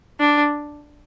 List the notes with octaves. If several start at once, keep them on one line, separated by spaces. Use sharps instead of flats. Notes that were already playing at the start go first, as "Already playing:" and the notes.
D4